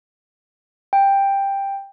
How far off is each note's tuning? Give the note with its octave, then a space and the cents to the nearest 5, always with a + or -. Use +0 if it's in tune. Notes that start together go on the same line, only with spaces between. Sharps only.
G5 +10